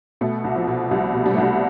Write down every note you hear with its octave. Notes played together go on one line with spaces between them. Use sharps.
B2 A3
C2
F3
B2
C2 G3
B2
G3
A3
C2 G3